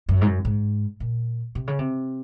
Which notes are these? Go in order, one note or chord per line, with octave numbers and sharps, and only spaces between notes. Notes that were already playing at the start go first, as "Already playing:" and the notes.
F#2
G#2
F#2
G#2
A#2
C3
C#3
C3